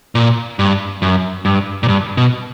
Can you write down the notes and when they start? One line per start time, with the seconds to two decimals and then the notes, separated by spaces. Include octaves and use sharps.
0.15 A#2
0.59 G2
1.02 F#2
1.45 G2
1.83 A#2
1.88 G2
2.17 B2